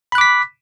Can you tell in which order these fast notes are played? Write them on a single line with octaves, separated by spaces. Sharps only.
B5 F#6 D6 B6